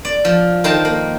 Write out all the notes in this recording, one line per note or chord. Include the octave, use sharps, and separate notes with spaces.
D5
F3
D#3 A#4 C5 A5
A#3